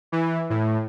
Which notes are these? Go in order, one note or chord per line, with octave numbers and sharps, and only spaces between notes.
E3
A2